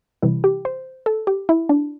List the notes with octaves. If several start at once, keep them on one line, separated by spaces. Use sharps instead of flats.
C3 E3 G3 E4
G4
C5
A4
G4
E4
D4